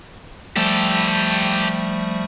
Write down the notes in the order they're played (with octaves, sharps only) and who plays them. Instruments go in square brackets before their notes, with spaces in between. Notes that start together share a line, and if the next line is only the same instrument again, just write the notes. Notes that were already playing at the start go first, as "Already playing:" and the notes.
[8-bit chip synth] F3 G3 A3 [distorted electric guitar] G4 A4